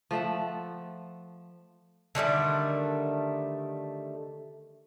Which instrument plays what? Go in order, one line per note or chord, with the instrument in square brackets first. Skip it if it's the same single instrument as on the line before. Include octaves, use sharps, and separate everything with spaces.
[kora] F3 A3 E5 F#5
[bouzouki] D3 D#3 G3 A3